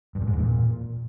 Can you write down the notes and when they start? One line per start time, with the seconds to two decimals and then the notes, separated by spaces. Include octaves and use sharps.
0.15 G2
0.21 A#2
0.27 G#2
0.33 E2
0.39 A#2